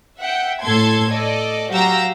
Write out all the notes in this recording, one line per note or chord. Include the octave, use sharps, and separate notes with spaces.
E5 F#5 G5
A2 A4 A5 C6 G#6
A4 D5 D#5
F#3 F#4 G4 F5 A#5 E6